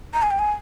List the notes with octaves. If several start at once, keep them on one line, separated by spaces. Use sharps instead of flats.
A#5
G#5
G5
G#5